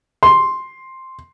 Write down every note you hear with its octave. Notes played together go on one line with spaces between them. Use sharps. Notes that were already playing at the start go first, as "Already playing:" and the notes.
C6